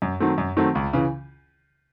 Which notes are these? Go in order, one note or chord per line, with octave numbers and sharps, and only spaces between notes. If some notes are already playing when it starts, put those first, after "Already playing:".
F#2
D#3 F#3 A3 C4
F#2
D#3 F#3 A3 C4
C#2
C#3 E3